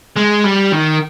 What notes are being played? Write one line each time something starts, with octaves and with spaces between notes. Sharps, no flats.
G#3
G3
D#3